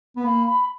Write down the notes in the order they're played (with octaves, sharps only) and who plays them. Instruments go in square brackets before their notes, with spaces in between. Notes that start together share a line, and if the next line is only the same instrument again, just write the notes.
[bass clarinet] B3
[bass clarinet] A#3 [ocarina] B5
[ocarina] B5